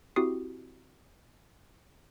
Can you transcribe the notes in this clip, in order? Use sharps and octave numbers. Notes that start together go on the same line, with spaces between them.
C4 E4 F#4 G4 D#6 C7